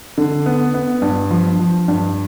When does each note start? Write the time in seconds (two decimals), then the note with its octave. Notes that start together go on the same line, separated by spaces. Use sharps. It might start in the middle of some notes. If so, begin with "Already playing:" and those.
0.18 D3
0.46 B3
0.74 B3
1.02 G2
1.31 F3
1.59 F3
1.88 G2